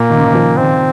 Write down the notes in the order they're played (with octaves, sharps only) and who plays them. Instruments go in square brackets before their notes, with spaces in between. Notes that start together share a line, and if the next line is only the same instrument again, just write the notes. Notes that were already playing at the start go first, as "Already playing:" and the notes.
Already playing: [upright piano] A#2 [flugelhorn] A#3
[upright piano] D#3
C#3
D#3
F3
[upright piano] D#3 [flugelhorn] C4